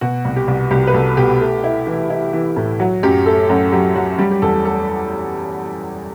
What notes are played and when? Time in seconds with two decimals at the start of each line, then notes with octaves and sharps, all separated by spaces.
0.01 B2 F#4
0.25 C2
0.36 G4
0.48 C2
0.71 C2 G4
0.87 B4
0.94 C2 A4
1.17 B2 G4
1.41 A3
1.64 E4
1.87 E3
2.10 E4
2.33 E3
2.56 A2
2.80 F#3 F#4
3.03 F#2 G4
3.26 A3 A4
3.49 F#2 F#4
3.72 F#3 G4
3.96 F#3 F#4
4.19 G3 G4
4.31 G4
4.42 E2 A4
4.65 A4